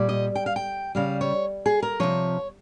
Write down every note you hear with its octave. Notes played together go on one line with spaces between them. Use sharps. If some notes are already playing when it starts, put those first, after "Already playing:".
Already playing: A#2 G3
D#5
G5
F5
G5
C#3 G3 F5
C#5
G#4
A#4
C3 F3 C#5